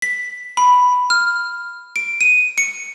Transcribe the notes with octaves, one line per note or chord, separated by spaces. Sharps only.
B6
B5
F6
D7
D#7
C#7